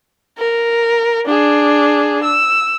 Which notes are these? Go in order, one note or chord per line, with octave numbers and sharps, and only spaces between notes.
A#4
D4 G#4
E6